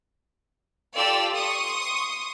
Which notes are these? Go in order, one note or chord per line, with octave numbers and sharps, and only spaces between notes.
F4 G4 A4 D5 E6
C6 C#6 D#6